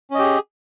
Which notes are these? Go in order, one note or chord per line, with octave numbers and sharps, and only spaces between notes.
C#4 G4 G#4 D#5